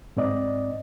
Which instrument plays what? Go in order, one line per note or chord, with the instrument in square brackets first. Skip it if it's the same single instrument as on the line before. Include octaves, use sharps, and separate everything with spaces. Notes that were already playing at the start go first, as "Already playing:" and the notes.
[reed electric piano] G#2 C4 D5 D#5